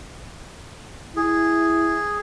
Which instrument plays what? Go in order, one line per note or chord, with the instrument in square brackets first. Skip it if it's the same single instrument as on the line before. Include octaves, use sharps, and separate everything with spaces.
[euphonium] E4 [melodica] G#4